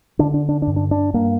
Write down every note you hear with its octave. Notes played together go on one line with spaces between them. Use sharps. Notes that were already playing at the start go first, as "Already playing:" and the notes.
D3 D4
D4
D4
D4
G2
D4
D4
G2 A#3